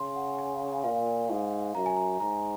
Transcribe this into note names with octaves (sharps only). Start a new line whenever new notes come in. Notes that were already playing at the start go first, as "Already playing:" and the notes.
Already playing: C#3 C6
F#5
G#5
G#5
A#2 F5
G#2
F#2 A#5
G#5
A#5
G#2 A#5